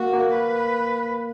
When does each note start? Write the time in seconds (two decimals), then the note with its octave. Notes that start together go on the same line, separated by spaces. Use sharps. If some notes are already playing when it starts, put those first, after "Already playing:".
Already playing: A#3 F#4
0.13 A#3
0.33 B4